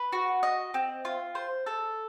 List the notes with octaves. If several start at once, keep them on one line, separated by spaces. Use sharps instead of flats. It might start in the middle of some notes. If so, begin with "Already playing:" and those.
Already playing: B4
F#4
D#5
C4
F4
C5
A4